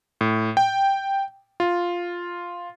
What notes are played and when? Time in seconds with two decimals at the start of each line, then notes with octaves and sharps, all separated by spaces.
0.21 A2
0.57 G5
1.60 F4